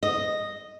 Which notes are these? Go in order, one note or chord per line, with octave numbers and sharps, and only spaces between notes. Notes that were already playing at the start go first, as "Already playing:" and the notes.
D#5